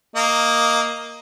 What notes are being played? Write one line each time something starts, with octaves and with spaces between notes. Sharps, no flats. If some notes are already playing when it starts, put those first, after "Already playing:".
A#3 D#5